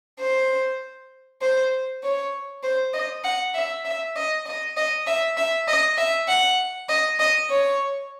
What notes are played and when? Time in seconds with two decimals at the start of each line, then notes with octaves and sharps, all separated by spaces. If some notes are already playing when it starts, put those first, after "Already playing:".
0.20 C5
1.42 C5
2.03 C#5
2.63 C5
2.94 D#5
3.24 F#5
3.55 E5
3.85 E5
4.16 D#5
4.46 D#5
4.77 D#5
5.07 E5
5.37 E5
5.68 D#5
5.97 E5
6.28 F#5
6.89 D#5
7.20 D#5
7.50 C#5